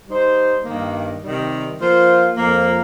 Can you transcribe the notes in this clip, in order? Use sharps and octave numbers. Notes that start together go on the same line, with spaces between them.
G3 D#4 C5
G2 D#3 A#3
C3 D#3 G3
F3 A#3 F4 C5
F2 F3 A#3